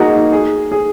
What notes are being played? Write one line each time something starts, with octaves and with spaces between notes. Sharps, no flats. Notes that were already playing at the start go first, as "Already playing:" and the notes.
Already playing: A#3 D#4 F#4 G#4
G#4
G#4